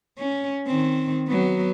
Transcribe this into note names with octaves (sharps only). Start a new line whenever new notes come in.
C#4
D#3 C4
F#3 B3